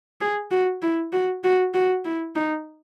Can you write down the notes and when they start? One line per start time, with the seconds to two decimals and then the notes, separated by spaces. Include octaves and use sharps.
0.21 G#4
0.51 F#4
0.82 E4
1.13 F#4
1.44 F#4
1.74 F#4
2.05 E4
2.36 D#4